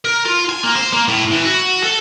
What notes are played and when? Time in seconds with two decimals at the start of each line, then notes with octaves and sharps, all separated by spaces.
0.05 A#4
0.25 F4
0.49 G#5
0.63 A#3
0.76 C5
0.93 A#3
1.08 A2
1.31 E3
1.44 F#4
1.83 A4